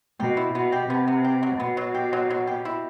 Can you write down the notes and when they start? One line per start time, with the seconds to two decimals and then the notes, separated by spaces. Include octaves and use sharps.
0.20 B2 G4
0.37 E4
0.54 B2 B3
0.72 G4
0.89 C3 B3
1.07 B3
1.24 G4
1.43 F#3
1.60 B2 B3
1.77 F#3
1.94 G4
2.13 F#3
2.30 F#3
2.47 G4
2.65 E4